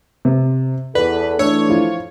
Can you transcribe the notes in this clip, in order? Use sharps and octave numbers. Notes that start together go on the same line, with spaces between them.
C3
E2 A4 B4 D5
E3 A3 D4 C#5 E6
F3 E4 F4